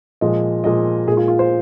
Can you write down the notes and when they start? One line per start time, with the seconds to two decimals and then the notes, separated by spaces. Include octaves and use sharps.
0.21 A#2 F3 G#3 D#5
0.64 A#2 F3 G#3 D#5
1.07 A#2 G#4
1.12 G#3
1.17 F4
1.28 F4
1.39 C5